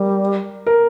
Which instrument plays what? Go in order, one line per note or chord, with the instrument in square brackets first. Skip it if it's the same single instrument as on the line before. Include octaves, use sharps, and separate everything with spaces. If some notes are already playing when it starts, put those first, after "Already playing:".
Already playing: [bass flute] G3 [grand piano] A#4
[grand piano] A#4